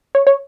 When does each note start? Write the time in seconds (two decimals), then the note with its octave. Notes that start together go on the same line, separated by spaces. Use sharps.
0.15 C#5
0.27 C#5